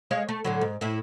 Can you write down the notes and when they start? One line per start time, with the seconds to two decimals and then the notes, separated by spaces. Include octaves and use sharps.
0.11 G#3 C#5 F5
0.29 A3
0.45 A2 D3 F#3
0.61 G#2
0.81 A2 E4